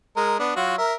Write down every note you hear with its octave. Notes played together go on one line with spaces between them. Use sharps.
G#3 A#4
B3 D4
F#3 F4 F#4
A#4 E5